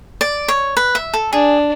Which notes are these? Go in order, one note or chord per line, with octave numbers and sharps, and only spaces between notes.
D5
C#5
B4
E5
A4
D4 G#4